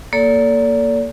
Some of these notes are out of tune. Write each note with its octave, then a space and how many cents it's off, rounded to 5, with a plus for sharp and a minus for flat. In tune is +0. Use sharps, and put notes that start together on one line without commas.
A#3 +0 A4 +0 D5 -40